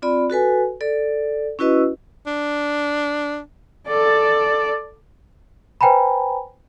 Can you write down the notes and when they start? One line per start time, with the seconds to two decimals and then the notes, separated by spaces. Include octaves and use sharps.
0.02 C4 F4 D5 B5
0.30 F#4 A4 B4 G#5
0.81 A4 D5
1.59 C#4 E4 F#4 B4 D#5 E6
2.26 D4
3.87 A4 D5
5.81 B4 C5 G5 G#5 A#5 B5